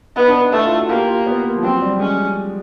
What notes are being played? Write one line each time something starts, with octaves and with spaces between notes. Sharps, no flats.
B3 D#4
D4
D#4
A3 E4
F4
F#4
A#3 G4
F4
B3
A#3
F3
F#3 C4
G3
G#3 C#4